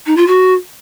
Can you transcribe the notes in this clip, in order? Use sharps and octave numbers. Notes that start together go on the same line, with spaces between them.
D#4
F4
F#4